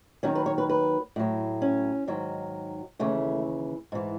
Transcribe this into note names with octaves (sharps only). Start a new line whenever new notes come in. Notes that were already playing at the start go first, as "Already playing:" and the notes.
D#2 D#3 F#3 C#4
B4
C#5
B4
B4
A2 F#3
C#4
G#2 D#3 F#3
D#2 C#3 E3 A3
G#2 E3